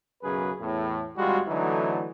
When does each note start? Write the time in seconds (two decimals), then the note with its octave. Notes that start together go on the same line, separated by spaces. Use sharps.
0.23 B1 F#2 C#3 G#4 B4
0.60 E2 A2
1.17 G#1 G3 G#3 F4 F#4
1.48 D3 E3 F#3 A3 D#4